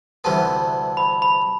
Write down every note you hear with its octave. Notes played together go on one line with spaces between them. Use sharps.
D2 C3 E3 G3 B3 A5
B5
B5